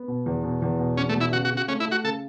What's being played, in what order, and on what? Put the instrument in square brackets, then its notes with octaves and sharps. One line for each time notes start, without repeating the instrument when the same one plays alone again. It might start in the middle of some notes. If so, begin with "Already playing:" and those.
Already playing: [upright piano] B3
B2
E2
B2
E2
B2
[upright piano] E2 [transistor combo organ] C#4
[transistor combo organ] A3
[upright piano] B2
[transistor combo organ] E4
[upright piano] C#3 [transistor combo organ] F#4
[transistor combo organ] F#4
[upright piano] C#3
[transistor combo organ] F#4
[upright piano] A3 [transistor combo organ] C#4
[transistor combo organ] E4
[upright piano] A3
[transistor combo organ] F#4
[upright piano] C#3 [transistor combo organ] A4